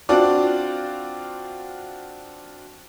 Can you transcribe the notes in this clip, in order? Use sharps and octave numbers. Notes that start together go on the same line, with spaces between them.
C4 D4 F4 F#4 D5